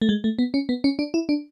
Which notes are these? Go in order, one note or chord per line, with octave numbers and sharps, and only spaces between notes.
A3
G#3
A3
B3
C#4
B3
C#4
D4
E4
D4